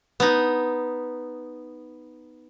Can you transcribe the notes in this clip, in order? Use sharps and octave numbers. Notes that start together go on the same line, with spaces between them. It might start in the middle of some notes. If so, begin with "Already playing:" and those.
B3 D#4